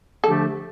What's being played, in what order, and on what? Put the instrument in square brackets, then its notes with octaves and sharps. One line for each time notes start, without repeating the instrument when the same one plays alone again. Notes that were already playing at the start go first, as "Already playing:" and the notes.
[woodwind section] D3 F3 A3 D4 G4 [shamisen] A4